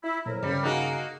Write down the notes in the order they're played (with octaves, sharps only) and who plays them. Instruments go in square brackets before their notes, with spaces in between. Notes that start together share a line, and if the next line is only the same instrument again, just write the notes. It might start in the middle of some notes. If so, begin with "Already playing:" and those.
[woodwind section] E4
[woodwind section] F2 F#3 A#4 [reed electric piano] A#2
[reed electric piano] G2 C#3 [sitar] G3
[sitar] A#3 D#4 F#4 [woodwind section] G#4 F5 F#5